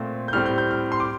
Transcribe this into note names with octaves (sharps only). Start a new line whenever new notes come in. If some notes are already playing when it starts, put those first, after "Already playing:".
Already playing: A#2 A3 C4
G6
A2 G3 C4 F6
G6
G6
F6
C6
D6